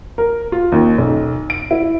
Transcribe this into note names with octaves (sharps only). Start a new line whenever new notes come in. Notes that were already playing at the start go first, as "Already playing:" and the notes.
A#4
F4
D#2
B1
D7
E4